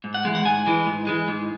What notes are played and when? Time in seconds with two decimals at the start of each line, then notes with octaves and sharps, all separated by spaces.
0.04 G#2
0.14 F#5
0.25 E3 G#3
0.35 F#5
0.45 G#2 G#5
0.67 E3 G#3
0.87 G#2
1.07 E3 G#3
1.28 G#2